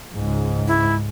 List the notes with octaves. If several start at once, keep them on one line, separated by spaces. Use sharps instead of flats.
C#2 G#2
E4